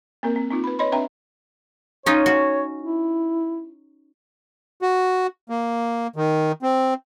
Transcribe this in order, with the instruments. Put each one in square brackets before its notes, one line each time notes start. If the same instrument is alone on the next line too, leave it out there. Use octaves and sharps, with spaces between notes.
[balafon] A#3 C4 A#4
C4
C4 D#4 F4
B4 B5
B4 C#5 D#5 B5 C6
C4 D4 B4 E5 G5 A#5
[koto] C#4 D#4 F4 [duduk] C#5
[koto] F#4
[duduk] E4
[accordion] F#4
A#3
D#3
C4